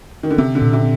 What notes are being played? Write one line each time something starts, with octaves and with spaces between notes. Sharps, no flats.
D#3
D3
C3 C4
D3
A#2
C3